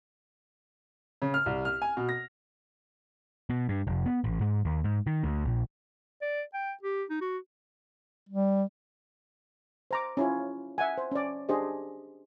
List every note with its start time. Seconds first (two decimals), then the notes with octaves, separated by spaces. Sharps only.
1.22 C#3
1.34 F6
1.46 C2
1.65 F6
1.82 G#5
1.97 B2
2.09 A#6
3.50 B2
3.69 G2
3.87 F1
4.06 B3
4.24 A1
4.41 G#2
4.65 D#2
4.84 G#2
5.07 D#3
5.24 D2
5.45 A#1
6.22 D5
6.54 G5
6.83 G4
7.10 D#4
7.21 F#4
8.29 G3
9.91 C5 A#5 D6
10.17 C#4 E4 F4
10.78 E5 F#5 G#5
10.98 C5
11.12 C#4 D5
11.49 D4 G4 G#4 C5 D#5